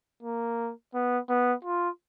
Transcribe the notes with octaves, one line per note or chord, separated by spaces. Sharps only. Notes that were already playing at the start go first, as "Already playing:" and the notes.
A#3
B3
B3
F4